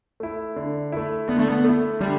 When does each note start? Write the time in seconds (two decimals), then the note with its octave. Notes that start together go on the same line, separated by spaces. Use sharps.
0.20 A3 E4
0.56 D3
0.92 A3 E4
1.28 D3 B3
1.39 A3
1.50 B3
1.64 A3 E4
2.01 D3 G3